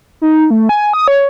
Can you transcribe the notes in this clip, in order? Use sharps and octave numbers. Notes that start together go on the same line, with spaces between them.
D#4
A3
G#5
D#6
C#5